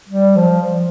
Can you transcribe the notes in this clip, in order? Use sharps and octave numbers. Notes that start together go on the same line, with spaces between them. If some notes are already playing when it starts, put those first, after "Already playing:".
G3
F3